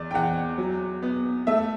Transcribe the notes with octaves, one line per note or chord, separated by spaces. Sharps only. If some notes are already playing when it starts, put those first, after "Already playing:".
Already playing: E2 D5
G5
E2 F#5
F#3
B3
A3 E5